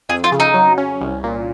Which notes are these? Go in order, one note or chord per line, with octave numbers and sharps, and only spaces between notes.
F2 G#4
F4
C#3
D#4
F#3
C#4
C2
A#2